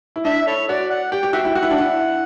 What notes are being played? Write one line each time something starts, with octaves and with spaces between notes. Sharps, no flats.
E4
D4 E5
E4 A4 C#5
F#4 D5
F#5
G4 G5
G4
F#4 E5 G5
E4
F#4 F#5
E4
D4
E4